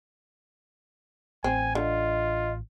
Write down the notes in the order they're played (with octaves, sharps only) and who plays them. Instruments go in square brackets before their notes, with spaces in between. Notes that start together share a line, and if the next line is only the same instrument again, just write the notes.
[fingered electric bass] A1 [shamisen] C4 [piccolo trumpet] G#5
[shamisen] D3 [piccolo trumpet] F4 [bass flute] D#5